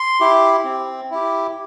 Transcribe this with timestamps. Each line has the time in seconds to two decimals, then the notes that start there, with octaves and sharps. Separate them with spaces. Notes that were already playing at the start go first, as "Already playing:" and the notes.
Already playing: C6
0.20 E4 G4
0.65 C4
1.11 E4 G4